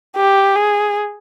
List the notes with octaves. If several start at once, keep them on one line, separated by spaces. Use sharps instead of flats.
G4
G#4